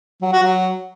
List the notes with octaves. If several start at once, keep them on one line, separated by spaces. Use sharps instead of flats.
F#3
F#4
F#3